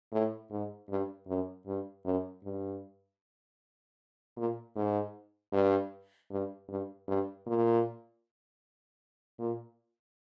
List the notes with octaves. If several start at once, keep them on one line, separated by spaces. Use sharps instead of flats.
A2
G#2
G2
F#2
G2
F#2
G2
A#2
G#2
G2
G2
G2
G2
A#2
A#2